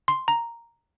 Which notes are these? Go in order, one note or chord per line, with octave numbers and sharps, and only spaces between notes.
C6
A#5